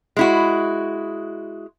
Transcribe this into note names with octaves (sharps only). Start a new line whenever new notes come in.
G#3 E4 F#4